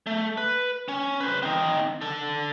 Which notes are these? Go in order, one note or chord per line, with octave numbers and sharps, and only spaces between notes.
A3
B4
C#4
B4 C5
C4 D#4
D4 A4